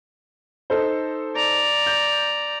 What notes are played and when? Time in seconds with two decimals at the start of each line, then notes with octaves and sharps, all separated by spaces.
0.70 D#4 A4 C5
1.36 D5 A#5
1.87 G6